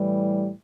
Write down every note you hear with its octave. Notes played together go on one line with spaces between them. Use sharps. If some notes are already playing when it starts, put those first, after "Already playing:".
Already playing: A2 E3 G3